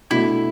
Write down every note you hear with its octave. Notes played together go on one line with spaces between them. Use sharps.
B2 A3 D4 E4